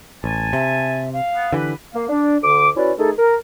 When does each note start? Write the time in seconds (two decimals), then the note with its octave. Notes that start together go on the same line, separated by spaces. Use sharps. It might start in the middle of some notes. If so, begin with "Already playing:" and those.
0.24 A1 G#5 A5
0.53 C3 E5
1.13 F5
1.35 B3
1.53 D3 E3 G4 B4
1.93 A#3 F5
2.09 D4
2.43 D2 D3 D6
2.76 C#4 E4 F#4 B4 D5
2.98 D#3 A3 D#4 G#4 A4
3.18 A#4